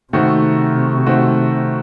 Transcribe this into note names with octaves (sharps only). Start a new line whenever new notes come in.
C3 D#3 A3 C4 F#4
D#3 A3 C4 F#4